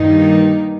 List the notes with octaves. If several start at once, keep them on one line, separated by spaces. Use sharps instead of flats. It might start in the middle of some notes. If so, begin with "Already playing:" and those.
Already playing: G2 D#3 A#3 D#4